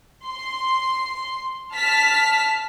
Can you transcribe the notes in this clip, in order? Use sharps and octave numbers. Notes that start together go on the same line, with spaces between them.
C6
A5 F6 B6